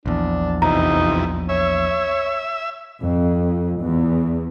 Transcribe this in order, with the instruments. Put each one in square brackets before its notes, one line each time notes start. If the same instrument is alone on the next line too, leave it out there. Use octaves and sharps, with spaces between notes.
[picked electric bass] A#1 E2 [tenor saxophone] D4
[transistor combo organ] F2 C3 E3 [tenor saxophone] D#4 [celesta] A#5
[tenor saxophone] C#5 [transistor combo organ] E5
[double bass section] F2
E2